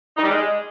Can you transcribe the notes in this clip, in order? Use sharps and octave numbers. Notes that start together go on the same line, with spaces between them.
D#4
G3
G#3